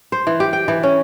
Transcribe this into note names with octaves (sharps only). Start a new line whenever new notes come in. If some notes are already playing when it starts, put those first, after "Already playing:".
C5
E3
G4
G5
E3
C#4